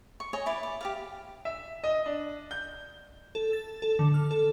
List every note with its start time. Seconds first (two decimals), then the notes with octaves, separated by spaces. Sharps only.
0.20 C#6
0.33 C#5 D#5 G#5
0.46 E4 B4 D5
0.63 D5
0.81 G4 D5 F5
1.45 E5
1.84 D#5
2.06 D4
2.51 G6
3.35 A4
3.53 A6
3.82 A4
3.99 D3
4.14 F6
4.31 A4